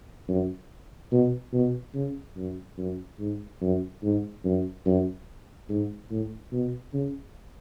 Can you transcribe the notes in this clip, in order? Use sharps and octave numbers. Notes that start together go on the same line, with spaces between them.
F#2
B2
B2
C#3
F#2
F#2
G#2
F#2
G#2
F#2
F#2
G#2
A2
B2
C#3